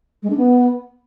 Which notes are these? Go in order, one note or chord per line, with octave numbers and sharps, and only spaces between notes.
G#3
D4
B3